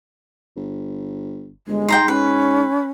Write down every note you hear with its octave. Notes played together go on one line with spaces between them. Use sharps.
G1
G1 G#3
G#2 G5 A#5 C6
C#4 B4